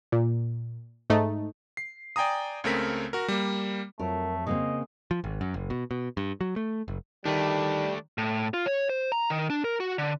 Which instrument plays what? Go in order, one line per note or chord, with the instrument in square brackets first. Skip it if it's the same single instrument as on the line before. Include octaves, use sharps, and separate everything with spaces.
[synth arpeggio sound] A#2
G#2 A3 D#4
[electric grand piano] C7
D5 G5 G#5 A#5 D#6
C#2 C#3 A3 C4 A#4 B6
F#4 A#4
G3 A#3
[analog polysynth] F2 F#3 [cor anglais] A3 [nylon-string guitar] A#4
[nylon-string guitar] C#3 A#3 C4 [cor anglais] D#5
[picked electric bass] F3
G#1
F#2
F#1
B2
B2
G2
F#3
A3
F#1
[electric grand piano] D#3 [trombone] G3 [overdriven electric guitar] A3 D4
[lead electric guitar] A2
F4
C#5
C5
A#5
D#3
D4
A#4
F#4
D3